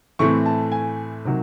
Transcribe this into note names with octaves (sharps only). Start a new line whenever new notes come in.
A2 E3 A3 C4 C#6
A5
G#5
C3 D#3 F#3